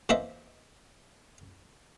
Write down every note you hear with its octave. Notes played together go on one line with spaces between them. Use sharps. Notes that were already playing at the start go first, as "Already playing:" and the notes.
E3 A#3 C5 D#5 E5